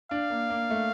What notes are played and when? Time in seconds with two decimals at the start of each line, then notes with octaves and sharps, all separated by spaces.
0.11 D4 F5
0.30 A#3
0.50 A#3
0.70 A3